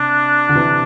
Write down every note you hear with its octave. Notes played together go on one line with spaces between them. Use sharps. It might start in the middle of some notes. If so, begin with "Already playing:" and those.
Already playing: C3 D4
D3
C3 E3